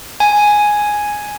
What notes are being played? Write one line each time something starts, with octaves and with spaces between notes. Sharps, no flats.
G#5